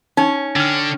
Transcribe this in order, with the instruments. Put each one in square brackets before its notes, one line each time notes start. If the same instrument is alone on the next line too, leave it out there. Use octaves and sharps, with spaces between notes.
[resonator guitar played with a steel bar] C#4 [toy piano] D#4
[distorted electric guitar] D3 [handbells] D4 F6